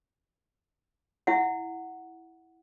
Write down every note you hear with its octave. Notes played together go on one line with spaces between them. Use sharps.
E4 E5 F#5